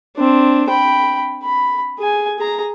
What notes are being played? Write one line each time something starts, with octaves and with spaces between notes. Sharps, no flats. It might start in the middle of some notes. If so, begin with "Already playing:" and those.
C4 D4
G5 B5
B5
G#4 G#5
G#4 A#5